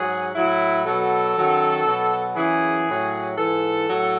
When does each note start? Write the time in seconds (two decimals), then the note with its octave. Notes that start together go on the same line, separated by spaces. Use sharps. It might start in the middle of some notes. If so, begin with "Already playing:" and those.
Already playing: G#2 F#3 G#4
0.34 A2 F#3 E4
0.85 B2 F#3 A4
1.35 F#2 D#3 F#3
1.86 B2 F#3
2.36 F#2 C#3 E3 G#4
2.86 A2 F#3
3.36 G#2 E3 A4
3.87 A2 F#3